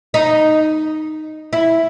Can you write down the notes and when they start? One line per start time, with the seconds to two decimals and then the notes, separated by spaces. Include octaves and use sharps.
0.14 D#4
1.53 E4